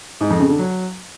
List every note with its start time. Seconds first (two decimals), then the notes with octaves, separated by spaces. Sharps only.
0.21 G#2
0.30 F2
0.40 C#3
0.49 D3
0.59 F#3